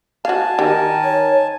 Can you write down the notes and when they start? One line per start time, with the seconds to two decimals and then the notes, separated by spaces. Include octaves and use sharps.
0.25 F#4 F5 G#5 A5
0.59 D#3 G4
1.04 C#5